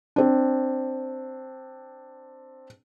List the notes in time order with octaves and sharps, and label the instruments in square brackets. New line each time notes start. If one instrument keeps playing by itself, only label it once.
[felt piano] C4 D4